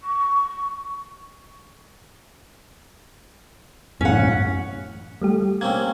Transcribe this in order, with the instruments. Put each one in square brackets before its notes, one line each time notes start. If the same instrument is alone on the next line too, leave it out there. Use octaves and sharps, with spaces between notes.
[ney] C#6
[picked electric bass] F#2 A2 E3 [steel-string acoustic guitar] C#4 F#5
[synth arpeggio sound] G3 A3 G4
[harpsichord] A#3 C4 C#4 [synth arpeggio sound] G#6